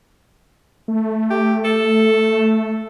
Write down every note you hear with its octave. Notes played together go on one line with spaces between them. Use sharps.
A3
G4
A4